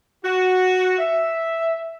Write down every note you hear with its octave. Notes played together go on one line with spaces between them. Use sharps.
F#4
E5